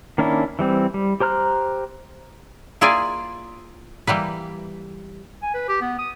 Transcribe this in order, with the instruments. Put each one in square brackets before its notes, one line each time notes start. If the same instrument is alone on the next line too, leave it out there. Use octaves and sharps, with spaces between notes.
[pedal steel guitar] D#3 A#3 C#4 D4 E4
E3 G3 C4
G3
G4 C5 A#5 F6 F#6
[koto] A#3 E4 F4 G#4 D5 G#5
E3 G3 A#3 B4
[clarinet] G#5
B4
G4
B3
D#6